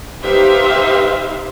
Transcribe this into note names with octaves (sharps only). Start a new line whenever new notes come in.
D#4 G4 B4 C5 E5 F5